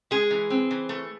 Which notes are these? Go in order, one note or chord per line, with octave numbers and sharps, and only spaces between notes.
G#3 G#4
E3
C4
E3
A3